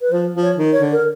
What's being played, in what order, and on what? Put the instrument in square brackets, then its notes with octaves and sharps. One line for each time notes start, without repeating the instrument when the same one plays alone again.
[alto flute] B4
[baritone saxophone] F3 [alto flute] C5
[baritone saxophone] F3
[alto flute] C#5
[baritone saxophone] D#3
[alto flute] C#5
[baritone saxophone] D3
[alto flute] A#4